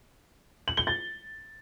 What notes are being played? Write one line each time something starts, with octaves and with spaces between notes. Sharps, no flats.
F#7
G7
A6